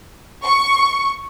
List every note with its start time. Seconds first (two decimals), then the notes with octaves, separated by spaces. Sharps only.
0.44 C#6